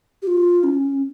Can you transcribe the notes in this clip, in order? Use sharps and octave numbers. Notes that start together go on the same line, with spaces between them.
G4
F4
C#4